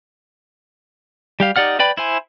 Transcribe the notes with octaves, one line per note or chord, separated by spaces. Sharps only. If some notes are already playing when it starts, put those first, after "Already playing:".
G3 G4 F5
D#4 G4 D5 F#5 F6
B4 D5 G5 B5
E4 C5 G#5